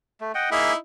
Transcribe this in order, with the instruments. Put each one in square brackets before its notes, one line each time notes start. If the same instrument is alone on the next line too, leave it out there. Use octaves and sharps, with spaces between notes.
[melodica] A3
D#5 F#5 G5
[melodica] A#3 G#4 E5 [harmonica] D#4 E4